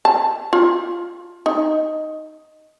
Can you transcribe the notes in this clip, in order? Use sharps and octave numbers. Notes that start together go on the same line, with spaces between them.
A5
F4
D#4